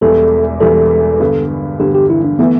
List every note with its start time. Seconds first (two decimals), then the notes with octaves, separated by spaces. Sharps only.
0.01 E1 E2 E3 G3 A4
0.60 E1 E2 E3 G3 A4
1.20 G2 D3 B3
1.79 G2 D3 B3 G4
1.95 G4
2.10 E4
2.25 D4
2.39 E3 A3 B3 E4